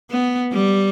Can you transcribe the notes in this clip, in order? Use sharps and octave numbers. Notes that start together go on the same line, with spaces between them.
B3
G3